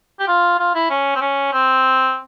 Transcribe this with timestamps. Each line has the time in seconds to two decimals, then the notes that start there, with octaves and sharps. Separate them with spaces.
0.19 G4
0.27 F4
0.59 F4
0.75 E4
0.90 C#4
1.15 C4
1.21 C#4
1.53 C4